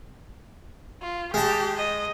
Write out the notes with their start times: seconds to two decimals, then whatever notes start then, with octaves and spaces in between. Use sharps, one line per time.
1.02 F4
1.34 G#3 G4 A5
1.77 D#5